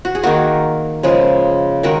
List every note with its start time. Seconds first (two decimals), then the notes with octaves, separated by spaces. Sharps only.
0.05 F#4
0.15 G#4
0.23 D#3 A#3 F#4 A#4
1.03 C#3 F3 G#3
1.83 D#3 G#3 F#4 A#4